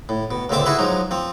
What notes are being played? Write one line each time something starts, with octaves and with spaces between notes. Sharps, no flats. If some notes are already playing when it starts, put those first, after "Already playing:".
A2
B2
C#2 A#2 D3 C4 E5 D6
E4 F#4 G#4 B4 E5
F3 F#3 G#3 D#4
F3 C4